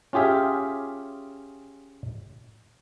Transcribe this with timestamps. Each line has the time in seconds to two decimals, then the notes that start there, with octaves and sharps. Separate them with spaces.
0.13 C#4 F4 G4 G#4 E5